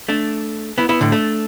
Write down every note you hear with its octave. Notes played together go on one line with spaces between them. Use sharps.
A3 D4
B3 E4
B3 E4
A2 D3
A3 D4